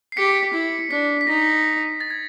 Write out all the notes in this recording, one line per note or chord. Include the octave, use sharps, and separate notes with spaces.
C7
G4 B6 C#7
E4
D4 B6
B6
D#4 A#6
A6
G#6